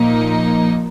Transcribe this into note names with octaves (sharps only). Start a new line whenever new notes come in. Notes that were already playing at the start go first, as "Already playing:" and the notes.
Already playing: A#2 F3 A#3 D#4